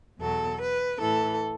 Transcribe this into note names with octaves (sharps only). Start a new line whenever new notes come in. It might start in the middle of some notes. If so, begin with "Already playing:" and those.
E2 B2 F#3 A4
B4
A2 E3 A4